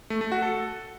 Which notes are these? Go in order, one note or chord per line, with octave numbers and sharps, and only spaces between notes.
A3
A3
F#4
A4